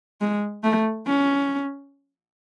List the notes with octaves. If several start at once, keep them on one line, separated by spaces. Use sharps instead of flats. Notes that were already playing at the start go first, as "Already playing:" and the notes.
G#3
A3
C#4